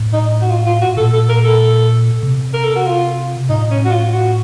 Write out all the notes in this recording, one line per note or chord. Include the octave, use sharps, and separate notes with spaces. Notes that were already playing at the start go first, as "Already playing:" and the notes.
Already playing: A2
D#4
F#4
F4
F4
F#4
A#2 A4
A4
A#4
A4
C3
A#4
A4
F#4
F4
A2 D#4
C#4
F#4
F4
F#4